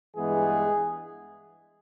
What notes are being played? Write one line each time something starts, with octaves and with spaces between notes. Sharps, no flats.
G2 E3 G#3 B3 G#4